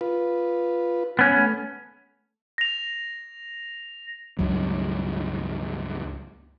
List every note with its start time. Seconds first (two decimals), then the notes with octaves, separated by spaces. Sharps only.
0.01 F4 B4
1.19 B3 C#4
1.37 A3
2.58 A#6 F7
4.39 C#2 G2 F#3